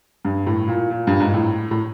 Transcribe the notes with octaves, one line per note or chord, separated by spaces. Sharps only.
G2
A2
A#2
A#2
G2
G#2
A2
A2